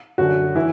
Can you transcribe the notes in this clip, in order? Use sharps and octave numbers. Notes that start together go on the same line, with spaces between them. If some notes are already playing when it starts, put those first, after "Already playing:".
F#2 D3 F#4
E3 E4